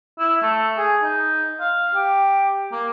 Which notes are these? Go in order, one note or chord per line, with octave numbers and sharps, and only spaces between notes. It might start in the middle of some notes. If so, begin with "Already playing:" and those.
E4
A3
G#4
D#4
F5
G4
A#3